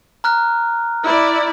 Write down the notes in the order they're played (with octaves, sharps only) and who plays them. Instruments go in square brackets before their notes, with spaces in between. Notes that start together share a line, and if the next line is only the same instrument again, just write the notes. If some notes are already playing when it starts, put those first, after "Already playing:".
[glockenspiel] A#5 F6 F#6
[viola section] E4 D5